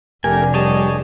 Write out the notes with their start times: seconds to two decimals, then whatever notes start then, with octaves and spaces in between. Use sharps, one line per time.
0.24 F1 A3 D4 G4 A#4 G#5
0.54 G3 G#4 C#5 D#5 A5